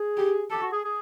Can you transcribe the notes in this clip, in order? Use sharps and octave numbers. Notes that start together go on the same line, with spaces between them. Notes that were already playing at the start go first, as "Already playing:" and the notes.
Already playing: G#4
G4
G4 A4
F#4
G#4
G#4